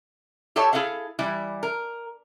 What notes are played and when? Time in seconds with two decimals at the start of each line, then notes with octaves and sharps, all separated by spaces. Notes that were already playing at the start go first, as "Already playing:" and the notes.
0.56 G4 A4 C5 C#5 E5 A5
0.73 E4 G#4 A4 E5 F5
1.19 E3 G3 E4
1.63 A#4